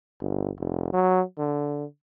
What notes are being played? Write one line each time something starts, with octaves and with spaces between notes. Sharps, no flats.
G1
F1
F#3
D3